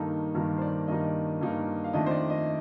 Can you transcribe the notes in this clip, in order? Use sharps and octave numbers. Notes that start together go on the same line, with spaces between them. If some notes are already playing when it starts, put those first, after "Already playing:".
Already playing: G2 D#3 A#3 D#4 A4
G2 D#3 A#3 D#4 A#4
C5
D5
G2 D#3 A#3 D#4 D#5
G2 D#3 A#3 D#4
F5
F2 D#3 A3 D4 D#5
C5
D5
D#5